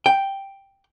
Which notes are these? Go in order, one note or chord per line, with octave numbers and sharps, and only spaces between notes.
G5